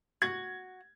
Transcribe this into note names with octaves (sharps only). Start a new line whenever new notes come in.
F#4 G#6